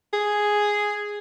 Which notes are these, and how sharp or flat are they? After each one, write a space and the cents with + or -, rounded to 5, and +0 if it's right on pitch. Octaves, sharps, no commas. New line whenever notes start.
G#4 +0